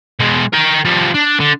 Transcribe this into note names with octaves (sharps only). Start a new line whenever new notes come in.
B2 G#3
A#4 G5
F3 G3
D4
D3